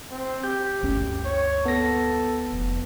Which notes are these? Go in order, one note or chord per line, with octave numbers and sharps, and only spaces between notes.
C4
G4 G6
G1 D2 C#4
C#5
B3 A4 A#6
F1